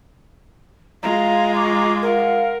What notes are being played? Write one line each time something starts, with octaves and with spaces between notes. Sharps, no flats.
G#3 F4 G#4 F5 A#5
C#6 D6
A#4 F5 F#5